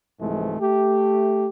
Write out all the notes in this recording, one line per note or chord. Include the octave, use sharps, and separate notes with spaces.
C2 G#2 E3 F3 G#3 A3
A3 G4